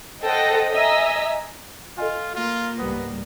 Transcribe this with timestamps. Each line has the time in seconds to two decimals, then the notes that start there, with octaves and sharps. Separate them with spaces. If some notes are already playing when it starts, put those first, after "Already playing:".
0.23 A4 C5 D#5 F#5 G5 A#6
0.71 D#5 E5 G#5 A#5 E6
1.98 F4 A4 D#5 G#5
2.35 A#3 F4
2.79 C#2 G#2 G3 B3